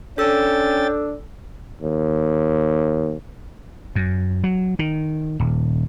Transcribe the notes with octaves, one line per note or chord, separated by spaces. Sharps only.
C#4 D4 A4 G5 E6 A6
D#2
F#2
F#3
D#3
D#1